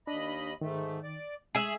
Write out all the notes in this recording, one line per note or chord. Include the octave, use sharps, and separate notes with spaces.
D#2 D4 D#5 B5
G#2 D#3 A3
D5
G#3 A3 G#4 E5